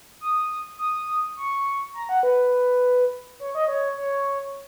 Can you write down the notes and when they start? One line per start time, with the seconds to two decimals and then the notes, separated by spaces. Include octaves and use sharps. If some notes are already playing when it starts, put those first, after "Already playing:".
0.21 D#6
0.78 D#6
1.37 C#6
1.94 A#5
2.09 F#5
2.23 B4
3.40 C#5
3.55 D#5
3.68 C#5
3.98 C#5